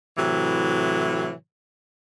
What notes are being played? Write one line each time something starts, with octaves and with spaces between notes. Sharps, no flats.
A2 C3 E3 F#3